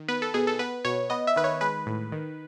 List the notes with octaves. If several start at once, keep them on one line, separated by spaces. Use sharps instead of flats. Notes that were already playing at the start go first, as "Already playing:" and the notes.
Already playing: D#3
B3 B4
A4
B2 G#4
A4
B3 B4
B2 C#5
B3 D#5
E5
D#3 B4
C#5
G#3 B4
A2
D#3